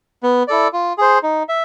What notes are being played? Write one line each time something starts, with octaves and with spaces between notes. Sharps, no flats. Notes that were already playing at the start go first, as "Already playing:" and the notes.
B3
E4 A4 D5
F4
G#4 C5
D#4
E5